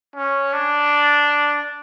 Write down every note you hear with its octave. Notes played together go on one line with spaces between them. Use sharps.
C#4
D4